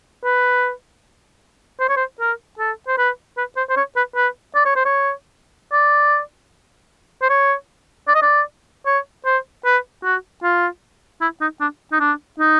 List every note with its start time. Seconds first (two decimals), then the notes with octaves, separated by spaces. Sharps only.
0.24 B4
1.80 C5
1.89 C#5
1.97 C5
2.20 A#4
2.59 A4
2.88 C5
2.98 B4
3.38 B4
3.57 C5
3.70 C5
3.77 C#5
3.96 B4
4.15 B4
4.55 D5
4.65 C#5
4.76 C5
4.85 C#5
5.72 D5
7.22 C5
7.30 C#5
8.08 D5
8.15 D#5
8.22 D5
8.86 C#5
9.26 C5
9.65 B4
10.04 F#4
10.43 F4
11.21 E4
11.41 D#4
11.61 D4
11.92 D#4
12.00 D4
12.40 D#4